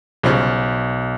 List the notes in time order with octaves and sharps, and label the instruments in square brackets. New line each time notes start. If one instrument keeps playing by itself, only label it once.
[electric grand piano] B1 [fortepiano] C#3 F3 G3